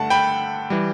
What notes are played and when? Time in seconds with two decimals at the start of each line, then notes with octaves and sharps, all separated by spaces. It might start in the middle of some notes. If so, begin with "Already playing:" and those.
Already playing: G2 D3 A3 F#5 A5
0.10 G5 B5
0.70 E3 G3